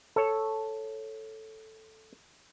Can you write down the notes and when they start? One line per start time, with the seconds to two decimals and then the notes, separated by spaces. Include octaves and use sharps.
0.16 A4 C#5